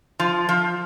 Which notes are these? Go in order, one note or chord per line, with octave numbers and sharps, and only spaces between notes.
F3
F3